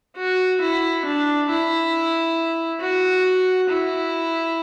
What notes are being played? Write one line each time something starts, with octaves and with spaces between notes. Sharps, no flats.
F#4
E4
D4
E4
F#4
E4